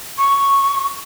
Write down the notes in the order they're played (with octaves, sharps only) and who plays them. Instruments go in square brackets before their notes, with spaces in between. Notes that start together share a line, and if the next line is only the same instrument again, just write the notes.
[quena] C#6